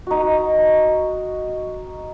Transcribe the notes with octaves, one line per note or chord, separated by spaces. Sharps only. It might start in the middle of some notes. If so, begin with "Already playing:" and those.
D#4 F#4